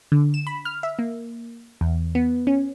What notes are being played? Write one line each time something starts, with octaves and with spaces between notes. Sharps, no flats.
D3
E7
B5
F6
E5
A#3
E2
B3
C#4